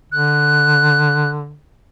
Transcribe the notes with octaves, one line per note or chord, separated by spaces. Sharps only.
D3 F#6